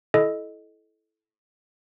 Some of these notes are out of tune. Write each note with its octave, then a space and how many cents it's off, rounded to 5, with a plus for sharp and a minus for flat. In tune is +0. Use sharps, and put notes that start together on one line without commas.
E4 +0 A4 -20 D#5 +0